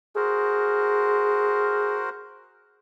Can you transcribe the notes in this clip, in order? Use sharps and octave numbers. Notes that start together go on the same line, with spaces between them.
F#4 G#4 A#4 C5